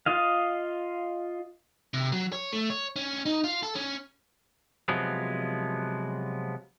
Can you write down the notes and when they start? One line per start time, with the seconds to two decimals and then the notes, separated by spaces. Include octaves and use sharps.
0.06 F4 D#5 F5
1.94 C3
2.12 F#3
2.32 C#5
2.53 A3
2.70 C#5
2.96 C#4
3.26 D#4
3.44 F4
3.63 A4
3.75 C#4
4.88 C3 F3 F#3 G#3 B3